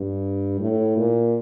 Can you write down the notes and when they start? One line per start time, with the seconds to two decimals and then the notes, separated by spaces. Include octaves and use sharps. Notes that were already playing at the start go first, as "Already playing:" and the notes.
Already playing: G2
0.59 A2
0.97 A#2